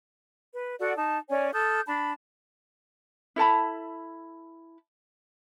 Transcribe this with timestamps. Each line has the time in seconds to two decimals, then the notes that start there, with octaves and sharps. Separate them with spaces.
0.55 B4
0.79 F#4 A4 D5 F#5
0.97 D#4 A5
1.30 C#4 C#5 D5 G#5
1.53 A4 D#6 F6 G6
1.86 D4 A5 B5
3.36 E4 A4 A5 B5